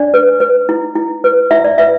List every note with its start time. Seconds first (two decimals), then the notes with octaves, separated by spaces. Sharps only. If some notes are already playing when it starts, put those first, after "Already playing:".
Already playing: D4 D5
0.14 B4
0.40 B4
0.69 E4
0.95 E4
1.24 B4
1.51 E4 E5
1.64 D5
1.78 B4 E5